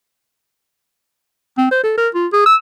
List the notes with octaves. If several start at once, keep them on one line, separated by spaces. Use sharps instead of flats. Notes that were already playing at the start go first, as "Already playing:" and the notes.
C4
C5
A4
A#4
F4
G#4
E6